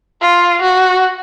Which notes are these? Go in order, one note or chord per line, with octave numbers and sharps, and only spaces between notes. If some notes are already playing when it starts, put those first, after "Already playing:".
F4
F#4